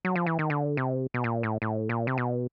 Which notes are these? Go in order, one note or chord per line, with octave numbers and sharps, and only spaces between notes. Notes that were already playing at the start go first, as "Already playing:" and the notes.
F#3
F3
E3
D#3
D3
C3
B2
A#2
A2
A2
A#2
C3
B2